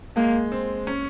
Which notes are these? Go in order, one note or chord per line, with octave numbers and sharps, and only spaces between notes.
G#3 A#3
C4
C#4